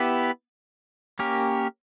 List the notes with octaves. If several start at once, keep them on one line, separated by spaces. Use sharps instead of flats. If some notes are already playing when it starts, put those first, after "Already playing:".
Already playing: B3 E4 G4 B4
A#3 C#4 G4 A#4